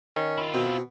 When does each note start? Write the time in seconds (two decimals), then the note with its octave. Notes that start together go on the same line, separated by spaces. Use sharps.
0.16 D#3 C#4
0.38 E4 F4
0.54 B2 C4